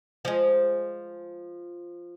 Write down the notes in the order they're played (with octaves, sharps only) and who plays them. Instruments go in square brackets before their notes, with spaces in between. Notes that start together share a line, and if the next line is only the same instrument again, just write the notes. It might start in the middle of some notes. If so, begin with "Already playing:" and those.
[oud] F3 G#3